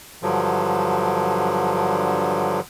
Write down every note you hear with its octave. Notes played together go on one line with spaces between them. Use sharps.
G2 D3 F3 F#3